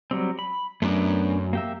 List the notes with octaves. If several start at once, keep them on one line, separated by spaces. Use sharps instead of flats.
F#3 G3 C4
B5
F#2 A3 B3 D4
A#3 G4 E5